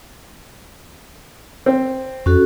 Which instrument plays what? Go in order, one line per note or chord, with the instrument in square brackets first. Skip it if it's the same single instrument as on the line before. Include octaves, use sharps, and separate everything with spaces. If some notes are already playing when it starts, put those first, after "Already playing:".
[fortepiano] C4
[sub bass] F2 [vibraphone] C#4 F#4 A4